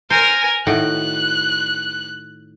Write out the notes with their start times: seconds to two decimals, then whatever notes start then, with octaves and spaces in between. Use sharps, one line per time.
0.10 A#4 C5 G#5
0.67 A2 D#3 F#4 F#6